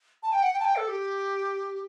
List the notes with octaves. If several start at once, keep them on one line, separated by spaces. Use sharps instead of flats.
A5
G5
F#5
G5
A5
G5
A4
G4